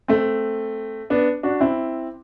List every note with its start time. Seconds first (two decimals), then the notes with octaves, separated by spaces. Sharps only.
0.08 A3 C4
1.10 B3 D4
1.43 D4 F#4
1.61 C4 E4